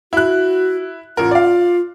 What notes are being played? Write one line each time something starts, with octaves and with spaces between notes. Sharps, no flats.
E4 F#4 F#6
A1 F4 A#4
D5 F5